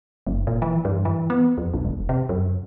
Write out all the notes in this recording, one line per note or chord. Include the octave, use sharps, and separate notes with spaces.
F#1
A#2
E3
G2
E3
B3
F2
B1
E1
C3
F#2